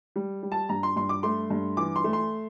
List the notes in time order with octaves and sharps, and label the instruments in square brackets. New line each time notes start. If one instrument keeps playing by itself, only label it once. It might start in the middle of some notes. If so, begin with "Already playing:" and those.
[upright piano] G3
G3
A5
G2 A#5
C6
G2 C6
D6
A3 C6
G2
E3 D6
C6
A3
C6